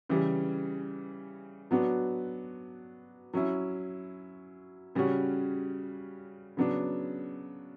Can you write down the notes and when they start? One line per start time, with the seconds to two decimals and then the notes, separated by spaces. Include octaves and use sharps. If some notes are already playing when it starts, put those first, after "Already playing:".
0.09 C#3 E3 G3
1.71 F#3 B3 D4 F#4
3.34 F#3 C#4 E4
4.95 C#3 G3 C#4 F#4
6.57 C#3 F#3 B3 D4